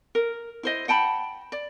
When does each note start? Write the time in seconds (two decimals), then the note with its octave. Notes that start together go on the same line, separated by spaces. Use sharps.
0.15 A#4
0.63 E4 C5 D#5
0.88 F#5 G5 A5 B5
1.52 D5